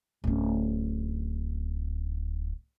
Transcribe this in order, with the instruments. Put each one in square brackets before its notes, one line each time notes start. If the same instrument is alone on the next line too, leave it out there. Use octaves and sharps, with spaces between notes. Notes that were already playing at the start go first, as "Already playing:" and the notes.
[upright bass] D1 C#4